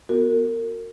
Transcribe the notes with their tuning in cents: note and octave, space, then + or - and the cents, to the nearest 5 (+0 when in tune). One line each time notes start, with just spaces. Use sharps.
B3 -5 F#4 -20 A#4 -30